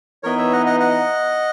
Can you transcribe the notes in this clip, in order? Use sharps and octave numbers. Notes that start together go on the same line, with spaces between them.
E3 B3 D#4 A#4 C#5
C#5 E5
D#5 F#5
D#5 F#5
D#5 F#5